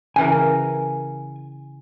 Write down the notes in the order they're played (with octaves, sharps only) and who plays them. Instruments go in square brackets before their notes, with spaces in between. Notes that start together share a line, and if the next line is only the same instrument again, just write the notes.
[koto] C#3 E3 A#4 [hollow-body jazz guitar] G#5